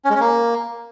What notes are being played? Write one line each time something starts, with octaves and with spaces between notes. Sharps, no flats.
C#4
G#3
C#4
A#3